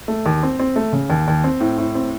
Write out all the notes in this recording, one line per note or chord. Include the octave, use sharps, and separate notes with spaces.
A3
D#2
C4
C4
A3
C#3
D#2
D#2
C4
A2
A2
C4